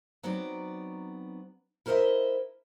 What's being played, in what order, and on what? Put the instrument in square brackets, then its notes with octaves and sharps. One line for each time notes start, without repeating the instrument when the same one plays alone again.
[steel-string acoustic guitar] F#3 B3 C4 D#4 F#4 D5
E4 A#4 C5 C#5 D#5 E5